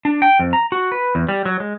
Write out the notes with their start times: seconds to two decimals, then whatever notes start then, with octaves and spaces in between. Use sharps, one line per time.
0.05 D4
0.22 G5
0.39 F2
0.53 A#5
0.72 F#4
0.92 B4
1.15 E2
1.29 G3
1.46 F#3
1.60 G#3